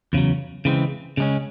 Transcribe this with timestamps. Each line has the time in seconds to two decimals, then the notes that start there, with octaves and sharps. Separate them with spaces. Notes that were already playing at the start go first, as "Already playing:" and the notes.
0.13 E2 C#3 F#3
0.65 C#3 E3 G#3 C4
1.17 C#3 G#3 C#4